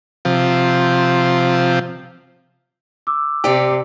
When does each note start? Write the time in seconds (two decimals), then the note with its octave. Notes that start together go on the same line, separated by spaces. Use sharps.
0.25 C3 F3
3.07 D6 E6
3.44 C3 G4 D5